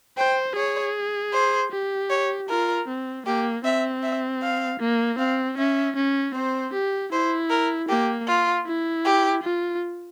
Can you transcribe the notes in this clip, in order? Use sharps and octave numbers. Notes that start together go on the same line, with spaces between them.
C5 G5
G#4 C#5
C5
G4
C#5
F4 A#4
C4
A#3 G4
C4 E5
E5
F5
A#3
C4 F5
C#4 E5
C#4
C4 C5
G4
E4 C5
A#4
A#3 G4
F4
E4
G4
F4